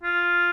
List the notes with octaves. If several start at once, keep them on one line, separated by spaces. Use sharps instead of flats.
F4